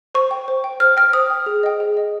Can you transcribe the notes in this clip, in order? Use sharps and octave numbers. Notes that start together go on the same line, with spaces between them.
C5 C#6
G5
C5
G5
C5 F6
G5 F6
C5 D#6
G5
G#4
D#5 G5
G#4
D#5 G5